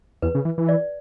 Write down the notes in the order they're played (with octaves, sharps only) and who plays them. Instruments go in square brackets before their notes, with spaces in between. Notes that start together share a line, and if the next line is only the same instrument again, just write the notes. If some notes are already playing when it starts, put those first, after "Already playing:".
[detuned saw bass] E2 [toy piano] B4
[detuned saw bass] C#3
E3
E3
[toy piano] D5